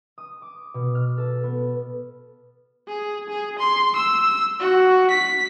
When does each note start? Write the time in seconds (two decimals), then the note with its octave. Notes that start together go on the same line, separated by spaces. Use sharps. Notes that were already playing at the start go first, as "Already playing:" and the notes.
0.18 D#6
0.42 D6
0.74 B2
0.95 F6
1.18 A4
1.43 B3
2.88 G#4
3.29 G#4
3.59 C6
3.96 E6
4.60 F#4
5.11 B6